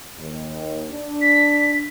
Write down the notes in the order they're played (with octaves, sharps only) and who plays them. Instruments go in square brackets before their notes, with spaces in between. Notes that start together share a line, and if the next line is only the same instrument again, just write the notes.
[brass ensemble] D#2
D4
[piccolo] B6